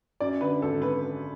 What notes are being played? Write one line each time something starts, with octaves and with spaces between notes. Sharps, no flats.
F#2 D5
D3 B4
G#1 A4
B4